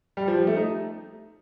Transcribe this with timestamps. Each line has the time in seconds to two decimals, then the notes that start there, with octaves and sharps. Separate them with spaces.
0.17 G3
0.28 F3
0.36 G3
0.47 A3
0.56 D#4